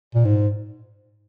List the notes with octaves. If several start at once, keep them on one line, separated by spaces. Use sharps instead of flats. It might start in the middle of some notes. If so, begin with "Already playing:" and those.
A#2
G#2